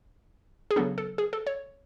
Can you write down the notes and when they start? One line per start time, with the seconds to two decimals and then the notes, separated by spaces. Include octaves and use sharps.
0.71 G#4
0.76 C#3 F#3 B3 D4 A4
0.98 A4
1.18 G#4
1.33 A4
1.47 C#5